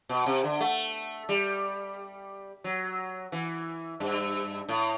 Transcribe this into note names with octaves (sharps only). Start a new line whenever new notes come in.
B2
C3
D3
A3
G3
F#3
E3
G2
A2